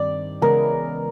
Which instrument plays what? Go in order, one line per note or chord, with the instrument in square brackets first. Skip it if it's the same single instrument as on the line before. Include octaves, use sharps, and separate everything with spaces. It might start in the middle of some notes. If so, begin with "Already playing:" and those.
Already playing: [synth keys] G2 D#3 G3 C4 [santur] D5
[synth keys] C#3 E3 G#3 B3 [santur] A#4